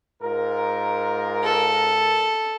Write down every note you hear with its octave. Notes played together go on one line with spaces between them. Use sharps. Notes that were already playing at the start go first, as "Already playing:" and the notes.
G#2 F4 A#4
A4